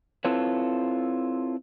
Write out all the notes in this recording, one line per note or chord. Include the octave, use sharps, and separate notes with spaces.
C4 E4 F4 A4 B4 C#5